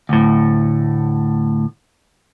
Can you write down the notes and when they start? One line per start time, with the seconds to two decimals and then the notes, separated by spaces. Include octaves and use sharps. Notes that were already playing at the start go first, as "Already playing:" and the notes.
0.09 D2 A2